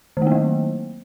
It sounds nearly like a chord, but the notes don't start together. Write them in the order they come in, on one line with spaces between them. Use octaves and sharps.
D#3 A3 A#3 F#3